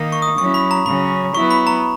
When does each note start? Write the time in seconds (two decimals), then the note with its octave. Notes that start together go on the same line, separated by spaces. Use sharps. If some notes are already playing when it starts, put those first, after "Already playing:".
Already playing: D#3 A#3 D#4
0.12 C#6
0.22 D#6
0.38 F#3 C#4 E4 C#6
0.54 B5
0.71 A#5
0.86 C#3 F#3 C#4 B5
1.34 F#3 B3 E4 C#6
1.51 B5
1.67 A#5